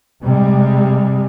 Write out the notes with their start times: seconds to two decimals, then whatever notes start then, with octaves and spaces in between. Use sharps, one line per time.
0.23 C3 G3 G#3